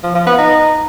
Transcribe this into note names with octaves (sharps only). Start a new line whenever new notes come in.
F3
F3
B3
D#4